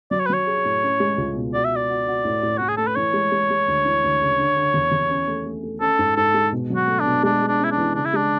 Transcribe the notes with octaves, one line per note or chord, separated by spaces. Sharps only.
F#3 D5
C#5
B4
F#3 C#5
G#4
A2
C#4
G#3
C#2
B2
F#4 D5
E5
F#4 D5
F#4
F#4
A2
A2
A2 F#4
G#4
A3 A4
B4
E3 C#5
G#3
G#3
G#3
D2
E3
D2
C#3
D3
D3
E2
E2
C#4
A3
A3
A3
C#4 A4
G#2
G#2 A4
G#3
B2
F#3
F#4
A3
D4
B2
G#3 D4
G#4
D4
C#4 E4
D4
E3
C#3 D4
E4
G#3 D4